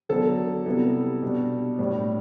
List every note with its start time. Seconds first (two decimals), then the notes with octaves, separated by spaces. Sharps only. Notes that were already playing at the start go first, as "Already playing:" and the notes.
0.09 D3 F#3 B3 D4 A4
0.66 C3 G3 B3 E4
1.22 B2 G3 D4
1.78 A2 G3 D4